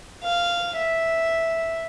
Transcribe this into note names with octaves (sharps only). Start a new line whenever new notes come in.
F5
E5